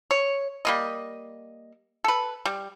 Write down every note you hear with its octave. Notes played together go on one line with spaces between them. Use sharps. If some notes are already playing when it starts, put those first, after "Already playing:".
C#5
G3 A#3 D#5
A4 B4
G3